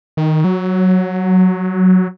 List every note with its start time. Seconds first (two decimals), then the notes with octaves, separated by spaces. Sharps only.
0.17 D#3
0.44 F#3